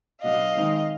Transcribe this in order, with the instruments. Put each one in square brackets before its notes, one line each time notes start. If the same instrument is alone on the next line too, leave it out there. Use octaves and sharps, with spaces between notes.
[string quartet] B2 F#3 B3 D4 D#5 F5
D#3 G#3 C4 D#4